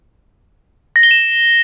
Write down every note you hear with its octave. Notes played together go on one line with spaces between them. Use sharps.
A#6
G7
E7